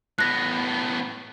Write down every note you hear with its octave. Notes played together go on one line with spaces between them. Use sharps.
A2 B3 F#6 A#6